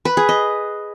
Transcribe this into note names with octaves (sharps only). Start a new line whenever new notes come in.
B4
G#4
D#5